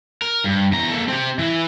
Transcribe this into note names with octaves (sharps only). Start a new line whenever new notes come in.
A#4
G2
E2 A#5
A#3 A4
C4 G4
E3 E4